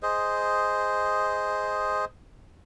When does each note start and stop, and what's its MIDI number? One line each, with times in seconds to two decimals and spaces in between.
0.03 2.05 68
0.03 2.05 72
0.03 2.05 75